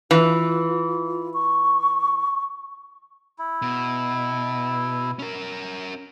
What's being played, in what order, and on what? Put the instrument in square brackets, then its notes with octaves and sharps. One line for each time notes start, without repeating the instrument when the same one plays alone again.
[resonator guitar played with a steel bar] E3 [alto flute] F4
[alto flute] C#6
[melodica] E4
[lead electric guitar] B2
C#4 A#4